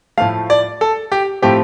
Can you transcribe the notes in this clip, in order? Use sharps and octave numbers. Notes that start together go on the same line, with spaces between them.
A2 F3 A3 F5
D5
A4
G4
A2 F3 A3 C4 G4